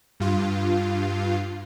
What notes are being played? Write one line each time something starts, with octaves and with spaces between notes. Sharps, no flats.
G2 F4